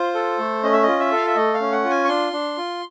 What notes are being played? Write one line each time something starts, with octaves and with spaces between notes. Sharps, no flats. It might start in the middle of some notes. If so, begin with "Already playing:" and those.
Already playing: F4 C5
A4
A3
C#4 D#5
E5
F4 D#5
E5
A4 F5
E5
A3 D#5
F5
C#4
F#5
F4
G#5
C#6
D4 C6
D4
F4